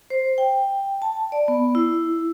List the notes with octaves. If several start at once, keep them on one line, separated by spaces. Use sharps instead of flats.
C5
G5
A5
D5
B3
E4